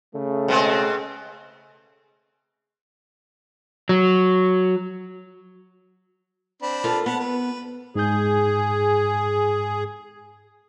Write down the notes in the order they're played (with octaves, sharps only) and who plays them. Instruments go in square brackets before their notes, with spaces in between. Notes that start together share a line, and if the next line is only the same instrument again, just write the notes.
[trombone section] C#3 A3
[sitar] B2 G#3 C4
[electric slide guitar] F#3
[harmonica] C4 D4 B5
[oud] F4 A4 A#4
[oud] B3 [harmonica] F#5 A5 B5
[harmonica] B4
[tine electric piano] G#2 G6 [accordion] G#4